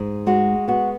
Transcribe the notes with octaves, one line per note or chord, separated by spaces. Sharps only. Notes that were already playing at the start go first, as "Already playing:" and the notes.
Already playing: G#2 G#4
G#3 F#4
B3 F#4